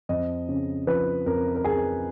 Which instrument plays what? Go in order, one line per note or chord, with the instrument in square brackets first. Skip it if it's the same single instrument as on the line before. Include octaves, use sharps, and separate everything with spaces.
[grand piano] F2 D#5
C#3
F3 B4
F2 A#4
A#4
F2 G#4